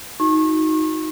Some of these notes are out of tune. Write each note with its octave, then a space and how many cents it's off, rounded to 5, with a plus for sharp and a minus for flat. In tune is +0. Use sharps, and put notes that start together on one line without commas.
D#4 +15 F#4 -25 C#6 -35